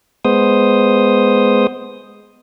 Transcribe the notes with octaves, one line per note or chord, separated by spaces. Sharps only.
G#3 B3 C5 D#6